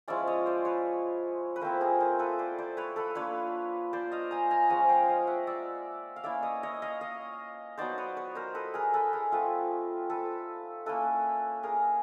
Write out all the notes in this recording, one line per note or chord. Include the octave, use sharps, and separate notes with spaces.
F3 G#3 C#4 E4 D5 E5
C#5 D#5
C5 D5
B4 C#5
B4
F3 A3 C4 E4 A#4 C5
G#4 A#4
A#4 C5
A4 B4
C5 D5
C5 D5
B4 C#5
A4 B4
A#3 D4 F4 B4 C#5
C5 D5
D#5 F5
G#5 A#5
G#5 A#5
F3 G#3 C#4 F#5 G#5
F5 G5
D#5 F5
E5 F#5
D5 E5
F5
A#3 C#4 E4 D5 E5
C#5 D#5
C#5 D#5
D#5 F5
D#5 F5
F#3 B3 D#4 C5 D5
B4 C#5
B4 C#5
A#4 C5
A4 B4
G#4 A#4
A4 B4
G#4 A#4
A3 C4 F4 A4 B4
A4 B4
A#3 C#4 E4 A4 B4
G#4 A#4